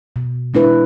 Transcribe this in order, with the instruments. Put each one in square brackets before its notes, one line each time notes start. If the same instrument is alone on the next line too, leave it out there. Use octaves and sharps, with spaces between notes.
[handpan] B2
G#3 D4 E4 B4